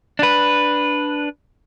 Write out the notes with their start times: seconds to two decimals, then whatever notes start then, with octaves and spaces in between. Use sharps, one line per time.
0.19 D4 B4